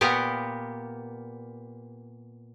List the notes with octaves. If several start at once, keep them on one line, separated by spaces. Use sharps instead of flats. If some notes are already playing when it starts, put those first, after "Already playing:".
A#2 B3 G4 A#4 F#5